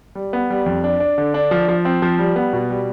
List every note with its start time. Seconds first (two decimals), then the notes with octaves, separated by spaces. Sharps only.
0.15 G3
0.33 B3
0.50 G3
0.66 F2
0.84 D4
1.00 D4
1.18 D3
1.34 D4
1.51 F3
1.68 F3
1.85 C4
2.02 F3
2.19 G3
2.36 B3
2.53 B2
2.70 G3